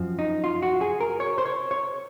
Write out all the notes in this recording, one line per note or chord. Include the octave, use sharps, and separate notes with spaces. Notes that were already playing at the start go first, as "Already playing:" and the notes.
Already playing: F#2 F3 C4
D#4
F4
F#4
G#4
A#4
C#5
C5
C#5
C#5